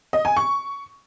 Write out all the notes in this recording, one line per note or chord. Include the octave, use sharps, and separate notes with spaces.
D#5
G#5
C#6